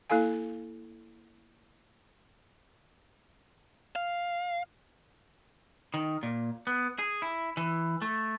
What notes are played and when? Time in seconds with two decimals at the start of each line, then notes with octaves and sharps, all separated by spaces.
0.10 A#3 E4 A4 F5 G#5
3.96 F5
5.94 D#3
6.23 A#2
6.67 B3
6.99 G#4
7.22 E4
7.57 E3
8.02 A3